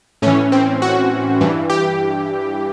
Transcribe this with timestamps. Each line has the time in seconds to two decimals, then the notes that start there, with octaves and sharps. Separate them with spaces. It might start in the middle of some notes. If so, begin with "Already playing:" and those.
0.22 A2 E3 C#4
0.52 C4
0.82 F#4
1.41 G2 E3
1.70 G4